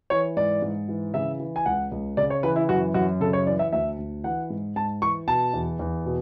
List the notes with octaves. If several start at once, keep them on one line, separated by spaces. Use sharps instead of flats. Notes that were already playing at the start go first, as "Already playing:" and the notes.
E3 C#5
G#2 D5
G#2
E3
C#3 E5
E3
G#5
C#2 F#5
C#2
C#3 D5
C#5
E3 B4
E4
F#2 F#4
F#2 F#4
C#3 A4
C#5
E3 D5
E5
D2 E5
D2
E3 F#5
G#2
G#2 A5
E3 C#6
B2 A5
E2
E2
B2